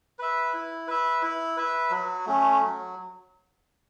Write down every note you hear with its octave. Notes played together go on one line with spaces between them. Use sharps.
B4 E5
E4
B4 E5
E4
B4 E5
F#3
A3 C#4
F#3